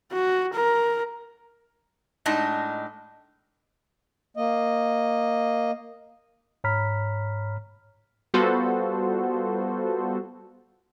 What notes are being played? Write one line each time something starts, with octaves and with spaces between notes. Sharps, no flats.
F#4
A#4
A2 G#3 D4 D#4 D#5
A#3 D#5
G#2 C#5 A#5 B5 F6 B6
G3 B3 F4 F#4 A4 C5